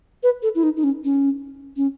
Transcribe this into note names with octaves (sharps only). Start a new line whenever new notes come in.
B4
A4
E4
D#4
D#4
C#4
C#4
C#4